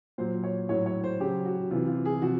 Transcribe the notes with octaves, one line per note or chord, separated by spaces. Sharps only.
A#2 F#3 C5
C#5
A2 F#3 C#5
C#5
C5
C#3 F#3 G4
F#4
C3 E3 F4
F4
G#4
C3 F3 F#4